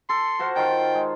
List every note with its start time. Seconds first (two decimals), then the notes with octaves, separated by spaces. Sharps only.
0.09 A4 C6
0.39 F#4 C5 F5
0.56 D#3 F4 F5 G5
0.95 G#3